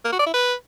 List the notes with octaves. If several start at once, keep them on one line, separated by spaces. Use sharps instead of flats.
A#3
F#4
D5
E4
B4